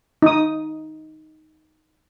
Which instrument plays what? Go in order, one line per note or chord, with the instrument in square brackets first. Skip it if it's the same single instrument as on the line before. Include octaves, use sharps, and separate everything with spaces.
[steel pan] D#4 D#6